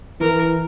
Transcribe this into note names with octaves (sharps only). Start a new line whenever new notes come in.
E3 A#4